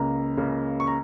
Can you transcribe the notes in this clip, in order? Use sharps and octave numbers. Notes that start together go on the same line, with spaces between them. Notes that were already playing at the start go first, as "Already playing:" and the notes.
Already playing: C#2 C#3 A#3 A#5
C#2 C#3 A#3
C#6
A#5